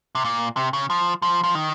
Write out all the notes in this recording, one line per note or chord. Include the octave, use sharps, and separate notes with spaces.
C3
A#2
C3
C#3
F3
F3
F3
D#3